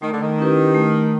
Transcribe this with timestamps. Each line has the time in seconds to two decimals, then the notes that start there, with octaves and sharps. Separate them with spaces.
0.01 D#3 A3
0.12 D3
0.21 D#3
0.39 C#4 E4 G4 B4
0.75 A3